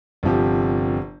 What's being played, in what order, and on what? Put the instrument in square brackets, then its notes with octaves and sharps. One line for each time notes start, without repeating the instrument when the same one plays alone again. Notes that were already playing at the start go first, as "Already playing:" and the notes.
[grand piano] G1 C3 F3 G4